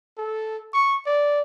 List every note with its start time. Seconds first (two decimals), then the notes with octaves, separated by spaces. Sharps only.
0.18 A4
0.74 C#6
1.06 D5